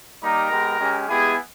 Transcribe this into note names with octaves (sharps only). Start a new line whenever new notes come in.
G3 A#3 D#4 G4 A#4 A#5
G#3 B3 G4
G#3 C#4 G4
G#3 B3 E4 G4 G#4 G#5